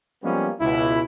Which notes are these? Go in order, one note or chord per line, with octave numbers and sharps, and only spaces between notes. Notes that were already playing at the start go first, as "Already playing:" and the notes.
F3 G3 G#3 A#3 B3 C#4
C#2 B2 E4